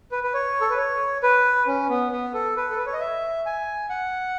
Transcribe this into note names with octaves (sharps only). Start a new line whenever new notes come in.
B4
B4
C#5
A4
B4
C#5
B4
C#4
B3
B3
A4
B4
A4
B4
C#5
D#5
E5
G#5
F#5